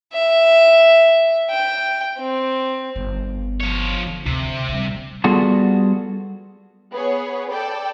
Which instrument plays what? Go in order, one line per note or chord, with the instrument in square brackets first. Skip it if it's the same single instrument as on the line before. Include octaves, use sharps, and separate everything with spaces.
[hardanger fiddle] E5
G5
C4
[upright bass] G1
[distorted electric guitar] F3 C#5
[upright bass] D3
[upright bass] D2 [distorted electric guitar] C3
[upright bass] D2 G3
[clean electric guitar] G3 B3 F4 F#4 G#4 A4
[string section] B3 G#4 C#5
A4 D5 G5